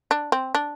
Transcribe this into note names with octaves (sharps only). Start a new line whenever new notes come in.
D4
C4
D4